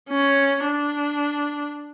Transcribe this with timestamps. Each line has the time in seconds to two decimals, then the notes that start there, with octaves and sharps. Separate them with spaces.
0.09 C#4
0.65 D4